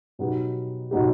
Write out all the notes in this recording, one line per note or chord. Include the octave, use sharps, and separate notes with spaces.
B2 F#3 B3 D#4 G4
B2 F#3 B3 D#4 G4